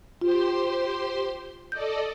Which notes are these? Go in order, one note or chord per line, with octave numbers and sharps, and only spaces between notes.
F4 G4 C5 C6
A4 D5 D#5 G6